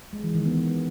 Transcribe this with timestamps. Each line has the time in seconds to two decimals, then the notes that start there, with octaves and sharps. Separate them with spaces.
0.13 G#3
0.24 E3
0.35 D#3
0.45 B3